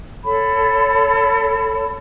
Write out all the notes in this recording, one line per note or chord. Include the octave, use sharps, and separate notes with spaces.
A4 C#5 A5 B5